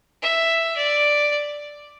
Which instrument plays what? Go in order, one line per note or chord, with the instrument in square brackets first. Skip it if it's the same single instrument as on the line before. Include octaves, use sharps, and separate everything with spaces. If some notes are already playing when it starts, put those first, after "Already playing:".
[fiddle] E5
D5